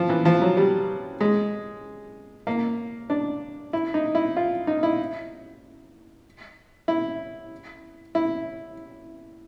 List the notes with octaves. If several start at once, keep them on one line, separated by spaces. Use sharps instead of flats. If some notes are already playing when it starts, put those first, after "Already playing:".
Already playing: F3
E3
F3
F#3
G3
G#3
A#3
D4
E4
D#4
E4
F4
D#4
E4
E4
E4